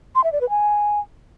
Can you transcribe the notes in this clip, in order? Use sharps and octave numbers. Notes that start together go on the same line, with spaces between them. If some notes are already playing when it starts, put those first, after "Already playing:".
C6
E5
D5
B4
G#5